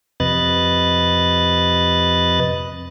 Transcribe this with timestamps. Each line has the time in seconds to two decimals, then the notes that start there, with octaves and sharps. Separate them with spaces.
0.20 F2 C3 B4 D#5 F#6 A6